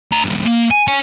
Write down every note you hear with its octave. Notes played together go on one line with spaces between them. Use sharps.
D2 A#5
C#2 G2
A#3
G#5
C#5 G#5